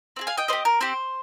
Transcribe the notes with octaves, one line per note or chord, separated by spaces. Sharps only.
C4 F4 G#4
F5 G#5
D#5 G5
C4 G4 C5 D#5
A#4
C4 G4 C5